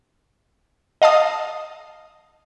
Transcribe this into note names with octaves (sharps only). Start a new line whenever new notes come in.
D#5 F5 A5 D#6